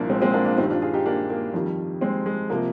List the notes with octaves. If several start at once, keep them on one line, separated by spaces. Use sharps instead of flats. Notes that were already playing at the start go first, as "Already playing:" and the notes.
Already playing: C2 A#2 F3 A#3 D4
G#3 C4
G#3 C4
A#3 D4
D4 F4
G2 D#3 G3 C4 D#4
D4 F4
F4 G#4
D#4 G4
A#3 D4
A#3
F2 D#3 G3
G#3 C4
G#3
C3 F3 A#3